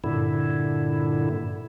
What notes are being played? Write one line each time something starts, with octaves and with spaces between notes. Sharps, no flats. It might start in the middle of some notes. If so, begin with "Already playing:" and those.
G2 A#2 D3 E4